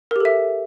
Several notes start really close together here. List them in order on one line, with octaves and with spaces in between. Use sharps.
A#4 G4 A4 E5